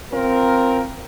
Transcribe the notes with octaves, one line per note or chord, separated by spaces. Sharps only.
C4 F4 A#4